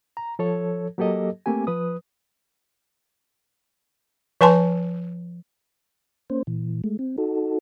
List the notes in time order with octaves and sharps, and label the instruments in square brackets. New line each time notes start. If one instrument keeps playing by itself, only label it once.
[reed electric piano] A#5
F3 A4 C#5
F#3 A#3 G4 A4 D#5
A3 A#3 C4 G4 G#5
F3 B4 D#6
[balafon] F3 B4 G#5 A5 C6
[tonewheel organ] A#3 C#4 C5
A#2 E3
G#3 A3
C4
D#4 F#4 A4